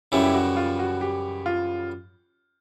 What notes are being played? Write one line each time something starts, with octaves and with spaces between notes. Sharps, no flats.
F#2 C#3 E3 G3 E4
G4
F#4
F4
F#4
G4
F4